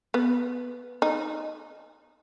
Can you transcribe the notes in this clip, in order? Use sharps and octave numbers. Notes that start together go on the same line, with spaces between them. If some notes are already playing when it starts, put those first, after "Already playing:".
B3
D#4